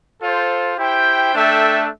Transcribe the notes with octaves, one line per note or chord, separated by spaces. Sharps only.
F4 A4 C5
E4 G4 C5 G5
A3 D4 A4 E5 G5